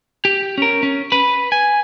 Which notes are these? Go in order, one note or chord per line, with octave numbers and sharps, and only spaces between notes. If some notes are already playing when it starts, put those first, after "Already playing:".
G4
C#4 A#4
C#4
B4 B5
G#5